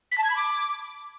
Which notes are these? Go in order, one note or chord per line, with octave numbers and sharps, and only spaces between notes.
B6
A5
G#6
B5
D6